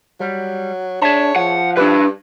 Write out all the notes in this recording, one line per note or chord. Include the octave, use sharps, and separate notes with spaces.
F#3 G3
D4 G#4 C#5 E5 A5
F3 F#5
G3 D4 E4 B4